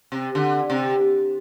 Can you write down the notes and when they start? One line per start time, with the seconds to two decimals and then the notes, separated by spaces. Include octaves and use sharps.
0.12 C3
0.35 D3
0.70 C3